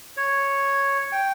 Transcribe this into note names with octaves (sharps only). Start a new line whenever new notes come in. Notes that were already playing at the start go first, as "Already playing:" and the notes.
C#5
G5